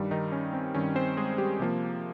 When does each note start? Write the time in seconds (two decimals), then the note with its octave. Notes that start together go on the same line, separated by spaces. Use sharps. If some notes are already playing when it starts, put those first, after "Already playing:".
Already playing: G2 D#3 G3
0.11 D#3 D#4
0.32 C#4
0.53 C4
0.75 G2 D#3 G3 C#4
0.95 C4 C5
1.17 G#3 G#4
1.38 G3 G4
1.59 C3 F3 A#3